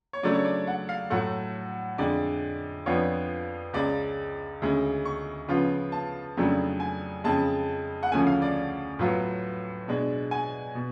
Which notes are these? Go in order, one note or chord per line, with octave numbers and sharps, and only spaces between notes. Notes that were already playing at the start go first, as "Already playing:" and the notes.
C#5
C#3 F#3 A3 D4 D5
C#5
D5
F#5
F5
A2 F#3 A3 F#5
F2 D3 G#3 D5
F2 F3 B3 D4 F4 C#5
C#2 C#3 G#3 D5
D2 C#3 G#3
C#6
C#3 F3 B3 F4
A5
F2 C#3 F#3 A3 D4
G#5
F2 C#3 G#3 A5
F#5
D2 C#3 F3 A3 C#4 G#5
F5
D5
A2 F#3 B3 F4
B2 G#3 D4
G#5
B2